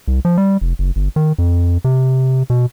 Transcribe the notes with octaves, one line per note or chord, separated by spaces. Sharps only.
C2
F3
G3
F1
F#1
G1
D#3
F2
C3
B2